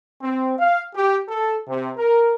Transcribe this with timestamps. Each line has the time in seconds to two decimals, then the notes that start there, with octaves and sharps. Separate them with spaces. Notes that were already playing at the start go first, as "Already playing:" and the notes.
0.21 C4
0.58 F5
0.95 G4
1.28 A4
1.67 C3
1.97 A#4